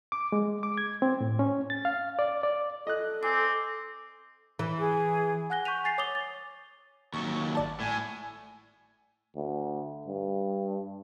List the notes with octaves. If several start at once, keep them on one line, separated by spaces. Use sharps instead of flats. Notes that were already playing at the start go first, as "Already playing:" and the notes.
D6
G#3
D6
G#6
C4
A2
C#4
A6
F5
D5
D5
A4 D#5 F#6
C4 G#5 D6
E3
G#4
F#5 G#5 F#6 A#6 G7
C#6 G6 B6 D#7 F7
G#5 A6 C7 F7
C#5 D6 D#6 F7 G7
A6
D#2 F#3 C#6
G#1 D5 A5
A2 G#5
D2
G2